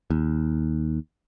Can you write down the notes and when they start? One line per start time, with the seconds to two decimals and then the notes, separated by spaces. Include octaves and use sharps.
0.10 D#2